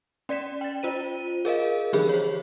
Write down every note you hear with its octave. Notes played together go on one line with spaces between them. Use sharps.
C#4 D5 B6 E7
G5 A6
F4 C5 D#7
G#4 A#4 D#5 F5
D3 E3 F3 G4 G#4 B5
C5 C#5